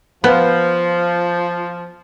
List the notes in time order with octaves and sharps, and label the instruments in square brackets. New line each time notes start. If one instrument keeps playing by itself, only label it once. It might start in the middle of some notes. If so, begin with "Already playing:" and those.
[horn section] F3 [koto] B3